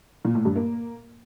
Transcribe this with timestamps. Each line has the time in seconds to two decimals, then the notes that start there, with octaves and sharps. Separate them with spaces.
0.25 A#2
0.35 A2
0.45 G2
0.56 A#3